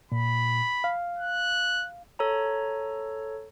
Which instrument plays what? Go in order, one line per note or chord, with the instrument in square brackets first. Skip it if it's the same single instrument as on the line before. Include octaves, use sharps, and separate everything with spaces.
[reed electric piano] A#2 [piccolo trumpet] B5
[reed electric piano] F5
[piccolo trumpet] F#6
[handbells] A4 C#5 A#5